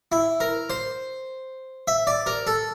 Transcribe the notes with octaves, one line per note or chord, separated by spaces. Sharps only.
E4
A#4
C5
E5
D5
A#4
A4